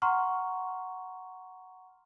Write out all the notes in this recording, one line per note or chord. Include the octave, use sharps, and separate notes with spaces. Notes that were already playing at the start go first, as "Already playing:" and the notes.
F#5 A#5 C6 C#6 F6